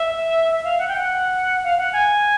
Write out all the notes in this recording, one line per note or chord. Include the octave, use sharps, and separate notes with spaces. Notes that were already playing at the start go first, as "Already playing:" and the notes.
Already playing: E5
E5
F5
F#5
G5
F#5
F5
F#5
G#5